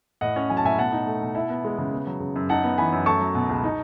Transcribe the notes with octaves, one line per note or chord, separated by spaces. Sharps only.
A2 D#5 F#5
C#4
F#3 G#5
A5
A2 E5 G#5
B2 F#5 A5
D#4
A3
B2
E4
B3
G#3
C#3
B3
F#3
C#3
F#2
D#4 F#5 A5
B3
E3 G#5 B5
F#2
A3 A5 C#6
F#3
B2
C#2
D#4